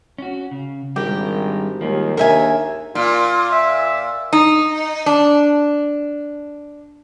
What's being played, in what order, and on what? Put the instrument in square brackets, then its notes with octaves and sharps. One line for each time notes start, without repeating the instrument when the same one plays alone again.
[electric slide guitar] C#4 F#4
C#3
[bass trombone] G#1 [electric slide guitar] G3 D4 A#4 [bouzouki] G4
[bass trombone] D#2 [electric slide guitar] F3 G3 G#3
[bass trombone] D#2 [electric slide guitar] D4 G#4 C#5 [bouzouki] A#4 E5 G#5
[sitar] A#2 [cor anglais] F4
[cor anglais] E5
[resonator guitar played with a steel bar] D#4
D4